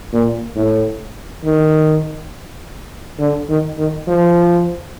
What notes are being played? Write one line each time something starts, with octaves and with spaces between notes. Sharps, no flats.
A#2
A2
D#3
D3
D#3
D#3
F3